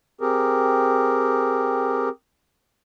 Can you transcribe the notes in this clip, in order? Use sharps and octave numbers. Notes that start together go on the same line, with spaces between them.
C4 G4 G#4 A#4